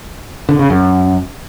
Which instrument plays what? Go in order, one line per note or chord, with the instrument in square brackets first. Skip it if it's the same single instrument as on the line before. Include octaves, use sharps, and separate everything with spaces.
[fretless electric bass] D3
C#3
F#2